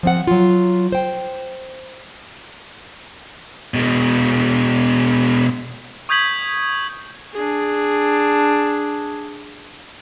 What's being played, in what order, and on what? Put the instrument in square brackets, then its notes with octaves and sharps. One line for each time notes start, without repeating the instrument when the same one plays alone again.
[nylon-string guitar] F3 C4 F#5
F#3 F4
C5 G5
[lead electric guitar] B2 G#3
[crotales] C#6 D#6 G6 G#6 B6 F#7
[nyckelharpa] D4 G#4